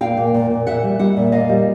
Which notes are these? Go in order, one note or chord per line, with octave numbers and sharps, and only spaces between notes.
A#2 F5 G5
A#2
A#2
A#2
A#2 E5 F#5
G3
G3 E5 F#5
A#2
A#2 D#5 F5
G3